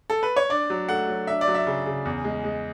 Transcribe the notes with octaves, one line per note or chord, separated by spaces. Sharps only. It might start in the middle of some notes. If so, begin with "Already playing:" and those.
A4
B4
C#5
D4 D5
F#3
A3 F#5
F#3
D4 E5
D5
F#3
E5
C#3
C#3
E2
G#3
G#3